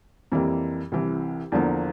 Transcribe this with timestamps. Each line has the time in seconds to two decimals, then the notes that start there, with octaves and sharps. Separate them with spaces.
0.32 F2 E3 G3 A#3
0.92 C2 C3 E3
1.52 E2 D3 F3 A#3